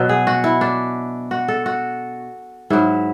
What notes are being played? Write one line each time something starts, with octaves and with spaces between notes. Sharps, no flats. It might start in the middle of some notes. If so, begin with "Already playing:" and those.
Already playing: B2 F#3
G#4
F#4
E4
D4
F#4
A4
F#4
G#2 F#3 E4